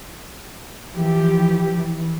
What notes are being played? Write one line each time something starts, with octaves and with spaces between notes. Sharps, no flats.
E3 F3 G4
E3